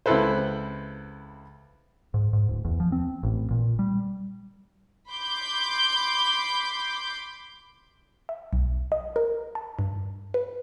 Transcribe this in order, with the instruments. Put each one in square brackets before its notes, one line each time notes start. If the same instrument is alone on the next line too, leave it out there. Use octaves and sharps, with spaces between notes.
[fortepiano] C#2 C4 E4 A4 B4 C5
[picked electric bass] G#2
G#2
D1
E2
F3
C4
A1
A#2
G3
[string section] B5 C6 D6 G6
[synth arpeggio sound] E5
B1
D#5
A#4
A5
G2
B4